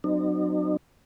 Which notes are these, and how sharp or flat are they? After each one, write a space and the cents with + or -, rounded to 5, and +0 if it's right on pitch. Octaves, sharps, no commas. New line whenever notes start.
F#3 +0 C4 -30 D#4 -45